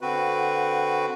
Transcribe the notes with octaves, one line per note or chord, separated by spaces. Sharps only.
D3 C4 F#4 B4